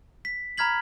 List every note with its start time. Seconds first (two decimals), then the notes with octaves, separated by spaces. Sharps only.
0.25 B6
0.58 A#5 B5 F6 G#6 B6 F#7